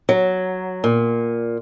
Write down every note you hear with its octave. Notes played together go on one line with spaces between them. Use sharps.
F#3
A#2